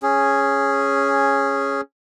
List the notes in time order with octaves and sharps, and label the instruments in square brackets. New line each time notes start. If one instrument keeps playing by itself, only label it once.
[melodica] C#4 G#4